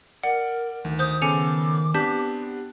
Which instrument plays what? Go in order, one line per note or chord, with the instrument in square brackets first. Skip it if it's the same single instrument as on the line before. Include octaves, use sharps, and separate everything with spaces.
[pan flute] A#4 [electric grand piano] D5 [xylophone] F#5
[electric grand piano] D2 [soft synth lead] D#3
[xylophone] C5 G6 [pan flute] D#6
[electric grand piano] C#3 B3 A4 [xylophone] G#5 C#7 F7 [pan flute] D6
[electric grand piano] B3 C4 D4 [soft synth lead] G4 [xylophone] A5 G6 B6